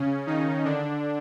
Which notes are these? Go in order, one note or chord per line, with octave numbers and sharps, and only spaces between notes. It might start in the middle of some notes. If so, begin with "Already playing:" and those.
Already playing: C#3 C#4
D#3 D#4
D3 D4